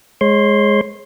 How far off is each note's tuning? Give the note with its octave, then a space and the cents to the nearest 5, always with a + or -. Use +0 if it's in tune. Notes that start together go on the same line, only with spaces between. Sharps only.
G#3 +0 C#5 -35 C6 +0